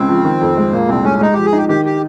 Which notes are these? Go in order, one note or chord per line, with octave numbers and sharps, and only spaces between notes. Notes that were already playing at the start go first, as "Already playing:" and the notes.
Already playing: C#2 C#3 C4
F3
D#3
F2
G#3
A#2 A#3
C2 C4
G#3 C#4
G#3 D#4
F3 G4
G#4
D#4 G4
D#3 G4
G4